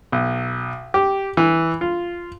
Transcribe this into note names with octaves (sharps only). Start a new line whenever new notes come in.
B1
G4
E3
F4